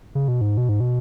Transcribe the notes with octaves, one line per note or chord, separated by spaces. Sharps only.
C#3
B2
G#2
B2
G#2
B2